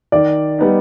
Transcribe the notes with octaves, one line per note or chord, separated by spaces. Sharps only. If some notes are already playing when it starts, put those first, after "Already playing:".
D#3 D5
G3 B3 D#4